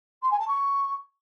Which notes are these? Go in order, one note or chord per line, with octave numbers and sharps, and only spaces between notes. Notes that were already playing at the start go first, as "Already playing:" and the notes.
C6
G#5
A5
C#6